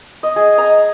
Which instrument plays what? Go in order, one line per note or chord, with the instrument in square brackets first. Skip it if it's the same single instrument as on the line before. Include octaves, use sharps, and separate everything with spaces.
[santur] D#5
G#4
D#5 G#5 A#5